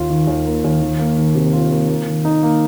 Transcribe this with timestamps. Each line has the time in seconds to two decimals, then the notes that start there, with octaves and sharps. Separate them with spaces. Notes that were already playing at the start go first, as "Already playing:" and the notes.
Already playing: D#2 F4
0.10 D#3
0.27 D#2
0.46 A#3
0.64 D#2
0.82 D#3
0.99 A#3
1.18 D#3
1.35 C3
1.53 F4
1.72 A#3
1.89 A#3
2.08 D#3
2.25 D#4
2.43 A#3